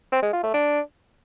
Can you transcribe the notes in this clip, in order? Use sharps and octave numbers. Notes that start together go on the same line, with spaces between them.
C4
G#3
F4
A3
D4